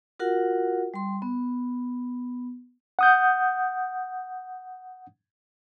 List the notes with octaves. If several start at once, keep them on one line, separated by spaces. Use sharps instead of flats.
F4 F#4 A#4 F#5
G3 C6
B3
F#5 D#6 G6